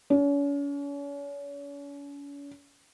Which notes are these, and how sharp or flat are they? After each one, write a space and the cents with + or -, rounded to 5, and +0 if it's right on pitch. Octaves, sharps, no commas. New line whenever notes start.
C#4 +40